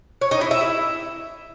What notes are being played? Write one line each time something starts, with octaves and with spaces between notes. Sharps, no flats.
C#5
D#4
E4
E5
E4